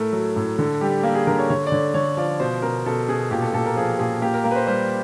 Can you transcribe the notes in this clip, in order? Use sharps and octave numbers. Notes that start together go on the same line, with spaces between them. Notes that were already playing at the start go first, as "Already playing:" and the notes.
Already playing: A2 A3 A#4
F#3
A2
D3 A4
G3 G4
A#3
G#4
D3 A#4
C#5
D3 C#5
D5
D3 C#5
D3 C#5
F3 D5
B2 C5
B2 A#4
B2 A4
B2 G#4
A#2 G4
A4
A#2 A4
A#4
F3 G#4
A#2 G#4
A#3 G4
A#4
A#3 A#4
B4
C5
G3 C5